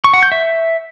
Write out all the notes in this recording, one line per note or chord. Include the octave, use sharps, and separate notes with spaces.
C#6
F#5
G6
E5